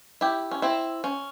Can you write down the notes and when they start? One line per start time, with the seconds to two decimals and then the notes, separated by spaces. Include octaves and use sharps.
0.21 E4 G4
0.51 C#4
0.62 C4 E4
1.04 C#4